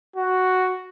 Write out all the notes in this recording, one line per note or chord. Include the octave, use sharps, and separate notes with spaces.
F#4